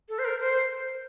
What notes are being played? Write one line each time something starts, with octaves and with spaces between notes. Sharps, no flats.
A4
C5
A#4
C5